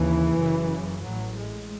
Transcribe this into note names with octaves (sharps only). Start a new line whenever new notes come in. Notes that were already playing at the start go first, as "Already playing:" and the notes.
Already playing: D#2 C#3 E3
F#1 F#2 C#3
A1 A2 F#3
G#3